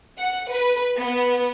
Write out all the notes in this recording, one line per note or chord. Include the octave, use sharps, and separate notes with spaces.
F#5
B4
B3